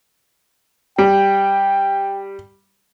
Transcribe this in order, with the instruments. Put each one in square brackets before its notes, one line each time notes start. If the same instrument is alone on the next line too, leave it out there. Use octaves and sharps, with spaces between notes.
[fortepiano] G3 [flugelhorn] G5